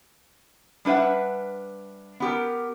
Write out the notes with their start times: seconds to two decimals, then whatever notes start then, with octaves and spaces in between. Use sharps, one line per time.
0.85 G3 D4 B4 E5 F#5
2.20 B3 G4 A#4